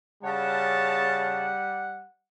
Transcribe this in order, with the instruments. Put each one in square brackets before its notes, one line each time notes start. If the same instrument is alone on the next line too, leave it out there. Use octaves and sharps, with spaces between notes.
[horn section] C#3 C#5 A5 [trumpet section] G3 F#5